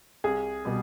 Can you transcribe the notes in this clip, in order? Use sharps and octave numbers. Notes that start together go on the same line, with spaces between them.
C2 G#4
B2 G3